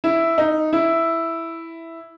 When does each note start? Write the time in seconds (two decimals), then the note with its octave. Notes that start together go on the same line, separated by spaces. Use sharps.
0.04 E4
0.38 D#4
0.73 E4